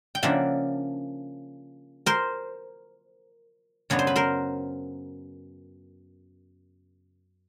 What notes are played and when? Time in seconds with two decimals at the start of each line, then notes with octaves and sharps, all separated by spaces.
0.15 G5
0.23 C#3 F3 A#3 D4 E5 F#5
2.06 A#4 C5
3.90 F#2 C#3 F#3 B3 D4 C#5
3.99 C5
4.07 B4
4.16 A#4 C5